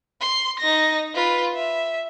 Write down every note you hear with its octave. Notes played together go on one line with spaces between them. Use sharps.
C6
D#4 A#6
F4 B4
E5